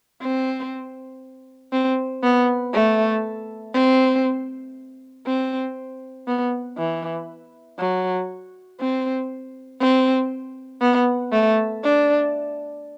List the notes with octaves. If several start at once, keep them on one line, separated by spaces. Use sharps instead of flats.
C4
C4
B3
A3
C4
C4
B3
E3
F#3
C4
C4
B3
A3
D4